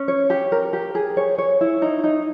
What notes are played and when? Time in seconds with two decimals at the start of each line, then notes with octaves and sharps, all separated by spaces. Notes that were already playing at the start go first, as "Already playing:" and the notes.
Already playing: C#4
0.08 C#5
0.30 G4
0.52 A#4
0.73 G4
0.95 G#4
1.17 C#5
1.38 C#5
1.61 E4
1.82 D#4
2.04 D#4